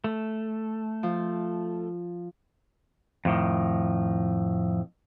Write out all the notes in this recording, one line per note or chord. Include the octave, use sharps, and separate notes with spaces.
A3
F3
F2 A2 D#3